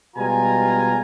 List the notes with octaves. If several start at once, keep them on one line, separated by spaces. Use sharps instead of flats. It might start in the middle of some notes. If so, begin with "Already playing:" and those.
B2 G3 G#3 F4 G#5 A#5